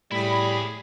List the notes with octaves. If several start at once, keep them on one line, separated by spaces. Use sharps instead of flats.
A2 G3 E4 G#4 B5